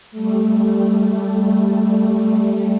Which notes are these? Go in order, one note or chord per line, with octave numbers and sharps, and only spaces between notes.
G3 A3